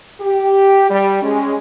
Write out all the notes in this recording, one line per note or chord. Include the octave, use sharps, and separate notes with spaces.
G4
G3
G#3 C#4